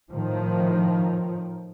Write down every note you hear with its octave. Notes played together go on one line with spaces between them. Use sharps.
A2 D#3 F3